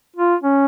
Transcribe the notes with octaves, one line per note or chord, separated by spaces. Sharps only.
F4
C#4